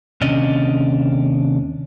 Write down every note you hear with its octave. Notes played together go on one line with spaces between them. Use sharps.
D#2 C3 C#4 D4 D#5